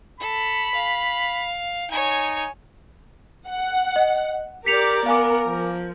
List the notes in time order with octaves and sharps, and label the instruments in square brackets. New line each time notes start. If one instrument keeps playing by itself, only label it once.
[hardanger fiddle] A4 [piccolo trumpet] B5
[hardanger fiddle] F5
[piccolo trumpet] D#4 [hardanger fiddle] C#5 G#5
[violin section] F#5
[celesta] D#5
[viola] G4 D5 [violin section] A#4 [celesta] B6 C#7 F7
[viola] B3 [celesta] F5 G#5 D6
[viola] F3